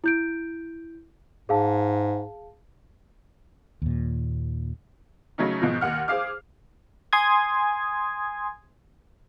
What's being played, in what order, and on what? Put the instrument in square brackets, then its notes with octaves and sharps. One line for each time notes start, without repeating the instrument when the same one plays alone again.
[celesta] E4 G6 D7
[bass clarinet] G#2 [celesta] G#4 F5 A5
[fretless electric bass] D#2 A#2
[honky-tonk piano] C#3 F#3 A3 C#4 D#4
G#2 B2 F3
D#2 F#5 F6
G#4 C5 F5 D6 F6
[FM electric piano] G#5 C6 D#6 G#6